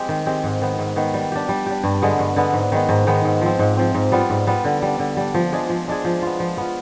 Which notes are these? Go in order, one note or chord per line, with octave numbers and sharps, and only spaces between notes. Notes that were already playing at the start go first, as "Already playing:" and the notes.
Already playing: G#3 C4 G4
D#3
G#3 C4 G4
G#2
D#3 B3
G#2
D#3 B3
G3
D4 G4
G3
D4 G4
G2
D3 G#3 B3
G2
D3 G#3 B3
G#2
D#3 G#3 B3
G#2
D#3 G#3 B3
G#2
F3 C4
G#2
F3 C4
G#2
G3 B3 F4
G#2
G3 B3 F4
D3
G3 D4
D3
G3 D4
F3
G#3 D4 G#4
F3
G#3 D4 G#4
F3
B3 F4
F3
B3 F4